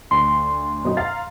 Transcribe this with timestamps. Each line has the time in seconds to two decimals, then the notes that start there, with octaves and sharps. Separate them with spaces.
0.11 D2 C6
0.84 F#2 B2 D#4
0.97 F5 A#5 A6